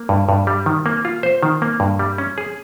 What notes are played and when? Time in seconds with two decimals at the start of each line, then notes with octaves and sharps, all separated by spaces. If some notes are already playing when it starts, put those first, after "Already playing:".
Already playing: A#3
0.09 G2
0.29 G2
0.47 G3
0.66 D#3
0.86 A#3
1.05 F4
1.23 C5
1.43 D#3
1.62 A#3
1.80 G2
1.99 G3
2.18 C#4
2.38 G#4